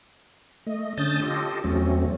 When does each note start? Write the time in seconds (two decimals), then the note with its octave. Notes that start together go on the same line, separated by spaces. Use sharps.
0.67 A3 D#5
0.97 D3 C#4 A5 D#6 G6 A6
1.22 F4 G4 A4 D#5
1.64 E2 F#3 A3 C4 C#4